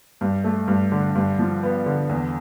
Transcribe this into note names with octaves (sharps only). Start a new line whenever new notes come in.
G2
A3
G2
D3
G2
F3
B3
D3
E2